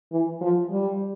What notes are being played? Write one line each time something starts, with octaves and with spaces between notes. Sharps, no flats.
E3
F3
G3